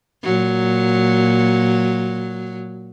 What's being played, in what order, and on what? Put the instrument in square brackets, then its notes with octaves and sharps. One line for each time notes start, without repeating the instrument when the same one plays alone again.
[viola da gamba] A#2 F#3